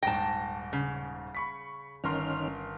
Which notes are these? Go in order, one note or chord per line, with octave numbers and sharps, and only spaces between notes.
D#1 G#2 G5 A5 A#6
C#3
B5 C#6 B6
G1 D#3 C#4 A#4 C6 F6